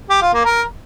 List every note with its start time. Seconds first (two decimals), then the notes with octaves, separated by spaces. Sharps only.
0.10 G4
0.21 F4
0.33 A#3
0.45 A#4